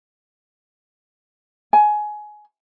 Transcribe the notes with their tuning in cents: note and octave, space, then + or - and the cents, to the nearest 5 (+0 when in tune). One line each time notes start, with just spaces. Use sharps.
G#5 +20